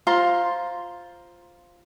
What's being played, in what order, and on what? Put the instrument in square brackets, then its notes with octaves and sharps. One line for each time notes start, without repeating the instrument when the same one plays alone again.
[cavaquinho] F4 C5 A#5 C6